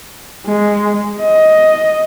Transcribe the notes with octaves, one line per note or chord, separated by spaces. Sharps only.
G#3
D#5